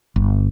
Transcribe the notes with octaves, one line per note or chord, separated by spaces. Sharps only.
G1